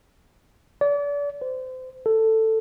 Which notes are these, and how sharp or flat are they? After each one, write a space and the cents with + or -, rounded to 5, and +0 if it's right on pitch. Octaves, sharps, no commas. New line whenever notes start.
D5 -35
C5 -30
A4 +10